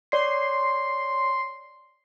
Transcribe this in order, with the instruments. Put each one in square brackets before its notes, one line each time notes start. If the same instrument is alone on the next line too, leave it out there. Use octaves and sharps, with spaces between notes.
[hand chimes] C#5 D5 C7 [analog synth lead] C6